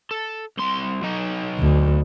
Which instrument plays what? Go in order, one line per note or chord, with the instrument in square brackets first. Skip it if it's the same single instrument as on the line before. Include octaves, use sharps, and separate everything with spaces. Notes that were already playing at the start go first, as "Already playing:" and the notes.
[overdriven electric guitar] A4
C2 C6
F#3 D#4
[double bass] D2